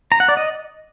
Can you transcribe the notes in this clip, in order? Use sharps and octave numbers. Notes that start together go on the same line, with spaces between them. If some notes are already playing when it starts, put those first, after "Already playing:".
A#5
F#5
D5
D#5